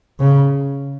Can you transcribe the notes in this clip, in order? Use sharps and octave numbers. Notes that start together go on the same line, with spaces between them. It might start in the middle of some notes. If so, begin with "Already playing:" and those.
C#3